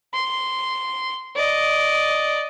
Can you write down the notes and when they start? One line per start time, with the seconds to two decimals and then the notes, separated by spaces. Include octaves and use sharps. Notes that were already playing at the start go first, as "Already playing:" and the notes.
0.14 C6
1.36 D5 D#5